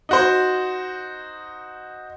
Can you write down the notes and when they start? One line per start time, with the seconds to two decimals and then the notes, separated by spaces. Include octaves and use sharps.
0.09 D#4 F#4 C5